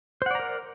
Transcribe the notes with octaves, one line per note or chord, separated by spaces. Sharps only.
A#4 C5 D5 F#5 A#5